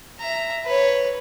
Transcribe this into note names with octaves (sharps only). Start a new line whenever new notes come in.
E5 A#5
B4 C#5